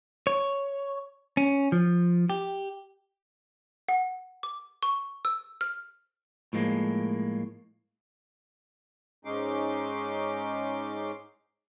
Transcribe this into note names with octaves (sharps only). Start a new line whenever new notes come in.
C#5
C#4
F3
G4
F#5
D6
C#6
E6
F6
A2 F3 G#3 A#3
G#2 G#3 C#4 D#4 C6 D6